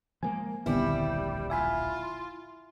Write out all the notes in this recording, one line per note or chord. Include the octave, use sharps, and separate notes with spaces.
F3 G#3 A#3 G#5
D1 A#1 D3 D#3 G3 B3 C4 E4
F4 E5 G#5 B5